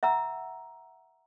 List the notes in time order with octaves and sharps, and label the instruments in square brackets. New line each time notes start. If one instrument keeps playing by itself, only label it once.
[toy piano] E5 F#5 A#5 E6